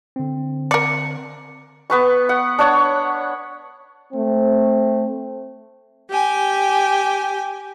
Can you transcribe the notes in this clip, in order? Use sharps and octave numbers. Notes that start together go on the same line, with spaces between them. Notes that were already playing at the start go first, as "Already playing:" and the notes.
D3 C4
A#4 D5 C#7
B3 B4 C#6
F#5
D4 C#5 F#5
A3 C4
G4 G5 G#5